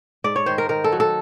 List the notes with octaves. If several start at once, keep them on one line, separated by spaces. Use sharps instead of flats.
G#2 D5
C#5
D#3 C5
A#4
D#3 A#4
A4
F#3
A4